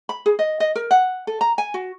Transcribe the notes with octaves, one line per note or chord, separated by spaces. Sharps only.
B5
G#4
D#5
D#5
A#4
F#5
A4
A#5
G#5
F#4